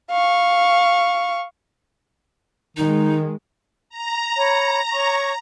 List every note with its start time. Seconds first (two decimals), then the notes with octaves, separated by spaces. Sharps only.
0.11 F5 C#6
2.77 D#3 G#3 D#4
3.90 A#5
4.38 C#5 B5
4.92 C#5 C#6 D6